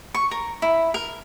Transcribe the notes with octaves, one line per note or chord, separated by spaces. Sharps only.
C#6
A#4
E4
A#4